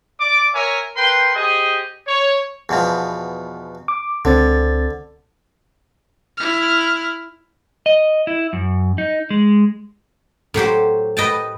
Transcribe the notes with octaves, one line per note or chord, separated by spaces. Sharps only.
D5 D6
A#4 C#5 E5 G#5
A#4 B4 G5 C6
G4 G#4 C5 D#5
C#5
E2 B2 F3
D6
C#2 D3 C4 A6
E4 F6
D#5
E4
F#2
D#4
G#3
A2 F#3 G4 C5
B4 D#5 G5 A5